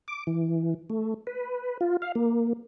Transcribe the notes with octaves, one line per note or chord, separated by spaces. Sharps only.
D6
E3
A3
B4
F4
F5
A#3